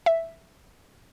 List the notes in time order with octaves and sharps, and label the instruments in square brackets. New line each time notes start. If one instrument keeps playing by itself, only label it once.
[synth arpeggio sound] E5